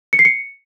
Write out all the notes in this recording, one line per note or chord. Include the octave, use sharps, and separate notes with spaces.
C#7
C7
C#7